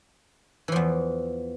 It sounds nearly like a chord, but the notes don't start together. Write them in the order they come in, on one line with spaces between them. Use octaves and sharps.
E3 F3 E2